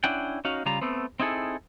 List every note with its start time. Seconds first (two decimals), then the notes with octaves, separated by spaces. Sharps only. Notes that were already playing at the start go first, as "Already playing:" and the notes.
0.04 C#4 D4 E4 F#5 G5
0.45 C#4 D#4 F#4 F5
0.66 C#3 G3 F4 A#5
0.81 A3 B3 C4
1.20 C4 D#4 E4 G#4 A4